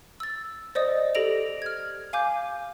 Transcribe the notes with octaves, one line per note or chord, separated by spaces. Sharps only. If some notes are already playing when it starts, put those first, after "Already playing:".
E6 A6
C5 D5 D#5 D#6
G4 A4 A#6 D7 F7
F6 G#6
F5 G#5 D6 G6